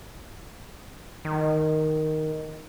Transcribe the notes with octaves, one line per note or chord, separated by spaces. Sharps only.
D#3